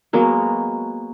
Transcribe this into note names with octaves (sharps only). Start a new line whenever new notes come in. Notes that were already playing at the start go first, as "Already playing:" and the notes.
F#3 G#3 A#3 B3